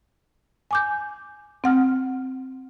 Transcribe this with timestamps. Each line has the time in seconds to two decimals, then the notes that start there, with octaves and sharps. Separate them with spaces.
0.71 G#5 D6 G6
1.64 C4 F#5 F6